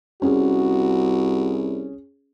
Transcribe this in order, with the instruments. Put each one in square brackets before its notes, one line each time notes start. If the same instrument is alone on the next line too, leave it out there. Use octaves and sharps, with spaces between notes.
[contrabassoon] C2 [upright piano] C#4 G#4 [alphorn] F#4